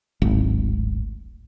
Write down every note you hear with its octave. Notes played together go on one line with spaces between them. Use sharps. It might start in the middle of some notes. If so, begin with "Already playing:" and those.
D1 G#1